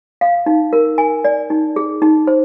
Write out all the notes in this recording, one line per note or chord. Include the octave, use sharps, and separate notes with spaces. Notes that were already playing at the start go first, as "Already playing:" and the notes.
F5
D#4
A#4
G#5
D5
D#4
G#4
D#4
C5